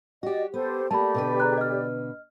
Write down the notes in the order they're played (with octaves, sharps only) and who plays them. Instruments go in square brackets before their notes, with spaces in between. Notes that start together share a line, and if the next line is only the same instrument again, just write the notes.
[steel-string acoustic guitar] F#4 G4 [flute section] D5 D#5
[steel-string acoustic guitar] B3 [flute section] G4 A4 C5
[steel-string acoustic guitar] A3 A#3 [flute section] G4 A4 D5 [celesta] A5 B5
[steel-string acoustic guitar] B2 D3 B4
[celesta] G#4 A#5 F#6
D#5 F6